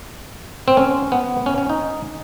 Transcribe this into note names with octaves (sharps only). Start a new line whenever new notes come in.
C4
C#4
B3
C#4
C#4
D#4